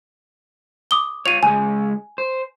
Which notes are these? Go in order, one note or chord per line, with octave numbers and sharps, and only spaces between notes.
D6 D#6 G7
F4 C#5 D#7 F7
C#2 G#3 G#5
C5